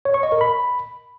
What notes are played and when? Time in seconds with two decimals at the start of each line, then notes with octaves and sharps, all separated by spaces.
0.05 C#5
0.14 C#6
0.23 D#5
0.32 A#4
0.41 B5